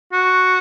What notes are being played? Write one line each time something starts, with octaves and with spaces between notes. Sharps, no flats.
F#4